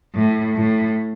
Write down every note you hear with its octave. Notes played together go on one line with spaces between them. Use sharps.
A2
A2